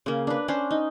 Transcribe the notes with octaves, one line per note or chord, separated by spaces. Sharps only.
C#3 A#3
D4 B4
C#4 D4 C5
D#4